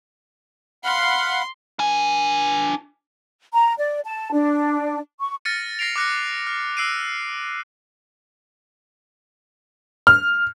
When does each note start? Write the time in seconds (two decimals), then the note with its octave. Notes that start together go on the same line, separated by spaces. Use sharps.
0.84 F5 F#5 B5 C6
1.79 D4 G#5
3.54 A#5
3.78 D5
4.05 A5
4.32 D4
5.21 C#6
5.45 F6 A6 A#6 C#7 D#7
5.79 A6 A#6 C7 D7 F7
5.96 D6 F6 F#6 A#6 C#7
6.47 F6
6.77 E6 F#6 C7 D7 D#7
10.07 F6